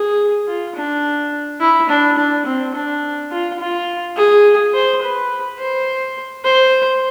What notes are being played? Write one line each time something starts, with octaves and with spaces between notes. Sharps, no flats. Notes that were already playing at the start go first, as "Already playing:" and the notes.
Already playing: G#4
F4
D4
E4
D4
D4
C4
D4
F4
F4
G#4
C5
B4
C5
C5